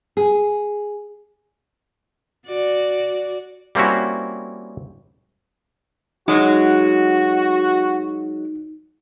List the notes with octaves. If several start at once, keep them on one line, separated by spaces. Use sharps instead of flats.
G#4
F#4 D5
G3 A#3 C4 C#4 E4 F#4
F#3 G#3 D#4 F#4